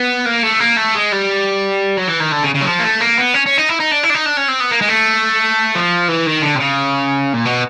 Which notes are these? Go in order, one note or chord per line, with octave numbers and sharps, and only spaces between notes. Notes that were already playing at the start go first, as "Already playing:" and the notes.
Already playing: B3
A#3
A3
A#3
A3
G#3
G3
F#3
E3
D#3
D3
C#3
C#3
F#3
F3
A#3
A3
A#3
B3
C#4
C#4
D#4
E4
D#4
D4
E4
D4
D#4
D4
C#4
C4
B3
A#3
G#3
A3
F3
E3
D#3
D3
C3
C#3
A#2
B2